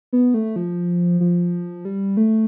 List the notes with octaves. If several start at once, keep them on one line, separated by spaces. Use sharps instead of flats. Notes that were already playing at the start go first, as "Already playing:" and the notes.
B3
A3
F3
F3
G3
A3